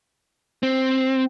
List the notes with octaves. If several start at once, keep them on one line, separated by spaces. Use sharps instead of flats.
C4